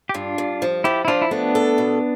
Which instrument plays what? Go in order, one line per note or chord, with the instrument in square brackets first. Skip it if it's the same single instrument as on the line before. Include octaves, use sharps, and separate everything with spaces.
[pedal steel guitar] G4
[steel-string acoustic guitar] G2 [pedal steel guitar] D4 F4
[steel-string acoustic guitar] G2
F3
[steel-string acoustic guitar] F3 [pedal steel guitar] E4 G4
[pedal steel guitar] E4
[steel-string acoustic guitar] F3 [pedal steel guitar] D4 F4
[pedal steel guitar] E4
[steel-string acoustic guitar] A3 [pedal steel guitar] B3 D4
[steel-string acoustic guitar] A4
B2